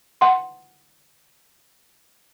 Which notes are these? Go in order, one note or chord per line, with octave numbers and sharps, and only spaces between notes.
F#5 C6